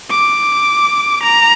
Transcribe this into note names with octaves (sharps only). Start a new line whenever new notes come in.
D6
A#5